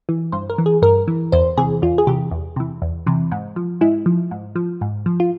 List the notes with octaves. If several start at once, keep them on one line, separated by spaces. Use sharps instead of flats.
E3
G2 C5
A#4
E3
G#4
G2 A#4
E3
E2 C5
C3 E3 G#4
E2 F4
G#4
C3 E3 G4
E2
C3 E3
E2
C3 E3
G#2
F3
G#2 E4
F3
G#2
F3
G#2
F3
F4